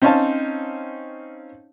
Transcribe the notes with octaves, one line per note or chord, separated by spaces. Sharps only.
C4 C#4 D#4 C#5 F5 A5